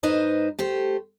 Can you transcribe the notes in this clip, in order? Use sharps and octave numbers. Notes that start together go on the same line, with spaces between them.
G#2 D#4 B4 C5 D#5
A3 G4 C5